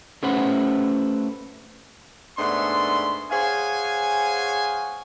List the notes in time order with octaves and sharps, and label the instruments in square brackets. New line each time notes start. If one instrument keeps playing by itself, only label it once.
[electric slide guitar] A3 C#4 G4 B4 C5 F#5
[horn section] G#2 A3 B3 D4 C6
G#4 C5 C#5 F5 F#5 G#5